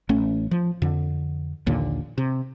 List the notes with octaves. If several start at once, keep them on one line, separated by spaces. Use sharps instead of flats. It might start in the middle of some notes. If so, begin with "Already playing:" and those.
A1 A3 C#4
F3
F2 D3
A#1 D#2 A#2 D3
C3